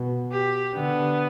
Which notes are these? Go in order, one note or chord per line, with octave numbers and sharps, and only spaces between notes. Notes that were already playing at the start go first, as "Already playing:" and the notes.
Already playing: B2
G4
D3 B3